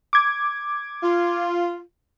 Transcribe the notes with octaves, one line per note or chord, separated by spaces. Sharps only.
D6 G#6
F4